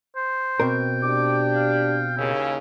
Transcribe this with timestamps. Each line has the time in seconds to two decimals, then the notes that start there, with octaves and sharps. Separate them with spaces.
0.16 C5
0.60 B2 C4 A#4 G5
1.03 D4 G4 D6
1.55 F5
2.17 D#2 C#3 E4